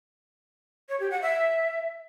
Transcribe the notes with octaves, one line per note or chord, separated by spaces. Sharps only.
C#5
G4
F#5
E5